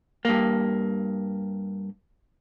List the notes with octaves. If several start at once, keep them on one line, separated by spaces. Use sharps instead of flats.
G2 A#3